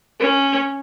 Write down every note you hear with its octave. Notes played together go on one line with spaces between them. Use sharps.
C#4